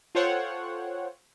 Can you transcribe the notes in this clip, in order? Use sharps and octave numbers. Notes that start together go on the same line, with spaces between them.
F4 A4 C5 C#5 F#5 G5